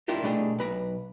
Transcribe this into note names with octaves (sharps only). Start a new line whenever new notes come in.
D4 E4 F4 G4 A#4
B2 A3 D4 G4 G#4
B1 B4 A#5